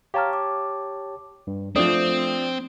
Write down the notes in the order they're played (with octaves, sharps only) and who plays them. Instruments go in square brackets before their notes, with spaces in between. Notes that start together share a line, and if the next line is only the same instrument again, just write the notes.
[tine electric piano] G4 C#5 A5 [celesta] F5 A#5 F6
[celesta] D6
[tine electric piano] G2
[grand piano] F3 D4 [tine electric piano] A3 [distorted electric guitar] C4 [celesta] D#6